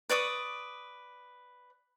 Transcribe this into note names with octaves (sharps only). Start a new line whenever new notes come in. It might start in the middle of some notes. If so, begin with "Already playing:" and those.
B4 D5 C#6 D#6